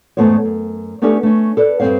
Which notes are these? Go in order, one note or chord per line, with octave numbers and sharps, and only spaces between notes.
E2 G#2 A3 B3 C5 C#5
F#2
A3 B3 C#4 D4 G4 A4
A3 C#4
A4 B4 D5
G2 C3 C4 C#5 F5